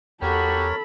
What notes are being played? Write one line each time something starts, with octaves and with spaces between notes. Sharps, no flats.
E2 F#4 G4 A4 A#4 C#5 B5